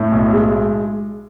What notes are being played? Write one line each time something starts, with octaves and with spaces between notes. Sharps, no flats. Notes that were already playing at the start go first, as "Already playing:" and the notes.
Already playing: A2
B1
G#3